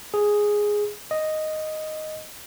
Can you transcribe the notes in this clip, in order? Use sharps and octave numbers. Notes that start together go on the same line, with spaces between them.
G#4
D#5